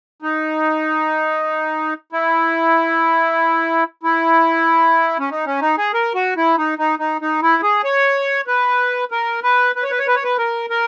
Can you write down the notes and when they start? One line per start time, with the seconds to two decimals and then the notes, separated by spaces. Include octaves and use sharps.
0.22 D#4
2.12 E4
4.03 E4
5.19 C#4
5.31 D#4
5.46 C#4
5.61 D#4
5.78 G#4
5.94 A#4
6.15 F#4
6.37 E4
6.58 D#4
6.78 D#4
6.99 D#4
7.21 D#4
7.42 E4
7.63 G#4
7.84 C#5
8.47 B4
9.11 A#4
9.43 B4
9.76 B4
9.83 C#5
9.91 B4
9.99 C#5
10.07 B4
10.15 C#5
10.24 B4
10.38 A#4
10.70 A#4